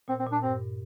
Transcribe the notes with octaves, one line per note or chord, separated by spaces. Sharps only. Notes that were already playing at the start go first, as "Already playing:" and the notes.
A#2 C4
C4
A#2
D4
G2 C4